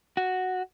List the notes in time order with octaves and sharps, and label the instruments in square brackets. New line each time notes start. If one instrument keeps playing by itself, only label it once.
[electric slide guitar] F#4